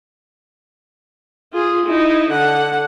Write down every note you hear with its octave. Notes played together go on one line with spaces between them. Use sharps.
F4 G#4
D#4 E4
D3 F#5